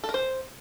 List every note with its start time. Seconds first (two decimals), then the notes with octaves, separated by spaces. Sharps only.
0.04 A4
0.09 A#4
0.14 C5